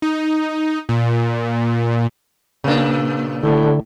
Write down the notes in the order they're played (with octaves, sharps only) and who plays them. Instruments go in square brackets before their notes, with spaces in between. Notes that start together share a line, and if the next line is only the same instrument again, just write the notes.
[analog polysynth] D#4
A#2
[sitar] A#2 D4 [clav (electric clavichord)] C#3 A#3
[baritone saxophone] A2 [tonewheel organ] D3